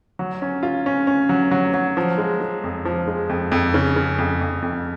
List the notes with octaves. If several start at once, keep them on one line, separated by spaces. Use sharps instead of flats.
F#3
C#4
F4
C#4
C#4
F#3
F#3
F#3
F3
G#3
G#3
F2
F3
G#3
F2
F2
C#3
C#3
F2
F2
F2